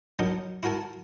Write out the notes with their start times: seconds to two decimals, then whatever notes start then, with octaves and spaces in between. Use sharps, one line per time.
0.19 F#3 D4 D#4 A#4
0.63 E4 F#4 A#4 G#5 A5